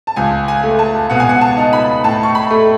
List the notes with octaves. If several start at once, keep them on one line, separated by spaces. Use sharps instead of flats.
A5
C#2 G#5
G#5
A3
A5
B2 F#5
G#5
F#5
A5
D#4
B5
A2 A5
C#6
B5
A3